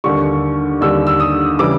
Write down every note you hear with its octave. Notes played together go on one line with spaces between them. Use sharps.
D#2 D3 G3 C#6
D#2 D3 G3 E6
E6
D#6
C#3 E3 G3 D6